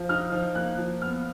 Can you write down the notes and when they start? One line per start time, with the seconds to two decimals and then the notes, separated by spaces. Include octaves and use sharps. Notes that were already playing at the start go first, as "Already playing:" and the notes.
Already playing: F3
0.09 D#4 F6
0.32 F3
0.55 A#3 F#6
0.78 F3
1.02 B3 F6